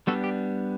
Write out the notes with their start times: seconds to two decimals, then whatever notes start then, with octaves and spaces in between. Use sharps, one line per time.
0.07 G3 B3 D4 F#4 A4
0.24 G4